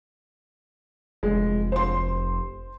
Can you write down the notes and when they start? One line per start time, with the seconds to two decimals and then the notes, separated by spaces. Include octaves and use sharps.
1.23 F1 G#3
1.72 C5 C6